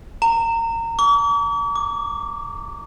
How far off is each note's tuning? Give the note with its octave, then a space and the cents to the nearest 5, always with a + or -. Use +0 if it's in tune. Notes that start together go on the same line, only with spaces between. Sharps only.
A#5 -25
D6 -45
D6 +10